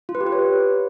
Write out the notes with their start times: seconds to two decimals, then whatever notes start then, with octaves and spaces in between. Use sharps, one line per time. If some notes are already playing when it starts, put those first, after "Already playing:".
0.09 F4
0.15 B4
0.21 G4
0.26 B4
0.32 C#5